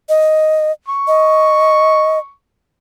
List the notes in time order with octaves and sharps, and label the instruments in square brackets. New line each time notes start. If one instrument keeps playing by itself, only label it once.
[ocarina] D#5
[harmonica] C#6
[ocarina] D#5